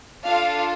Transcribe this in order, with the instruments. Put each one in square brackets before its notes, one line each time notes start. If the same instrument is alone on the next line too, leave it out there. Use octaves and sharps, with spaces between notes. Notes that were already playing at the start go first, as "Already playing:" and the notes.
[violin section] D4 F4 A4 F5